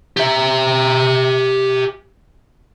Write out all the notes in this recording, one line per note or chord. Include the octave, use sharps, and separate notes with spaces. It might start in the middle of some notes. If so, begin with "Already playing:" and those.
G4 E5